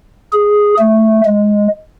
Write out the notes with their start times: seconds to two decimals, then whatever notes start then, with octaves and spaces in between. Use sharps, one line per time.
0.32 G#4
0.79 A3
1.25 G#3